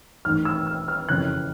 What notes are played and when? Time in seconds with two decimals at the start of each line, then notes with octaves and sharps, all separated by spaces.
0.25 A1 G#2 D#3 F6
0.45 E6
0.67 F6
0.88 F6
1.09 F#1 F2 C#3 E3 F#6